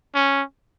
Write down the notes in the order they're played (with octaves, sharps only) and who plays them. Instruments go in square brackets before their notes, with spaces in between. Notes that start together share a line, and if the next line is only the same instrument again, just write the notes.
[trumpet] C#4